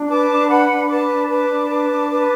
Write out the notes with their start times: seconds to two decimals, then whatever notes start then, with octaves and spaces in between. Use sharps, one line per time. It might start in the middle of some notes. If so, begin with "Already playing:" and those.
Already playing: D4
0.08 B4 A5 D6
0.29 D4
0.48 B4 F#5 B5
0.69 D4
0.88 B4 A5 D6
1.08 D4
1.28 B4 A5 D6
1.48 D4
1.69 B4
1.89 D4
2.08 B4